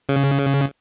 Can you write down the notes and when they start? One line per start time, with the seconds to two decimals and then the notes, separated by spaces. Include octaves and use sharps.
0.09 C#3